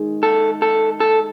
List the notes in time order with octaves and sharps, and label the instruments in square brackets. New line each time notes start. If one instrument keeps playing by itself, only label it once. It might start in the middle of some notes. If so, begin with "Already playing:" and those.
Already playing: [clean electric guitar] D#3 G#3
A4
A4
A4